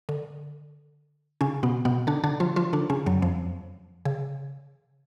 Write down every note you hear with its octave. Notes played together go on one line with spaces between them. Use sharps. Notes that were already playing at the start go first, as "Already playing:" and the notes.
D3
C#3 C#4
B2 B3
B2 B3
D3 D4
D3 D4
F3 F4
F3 F4
D3 D4
C#3 C#4
F#2 F#3
F2 F3
C#3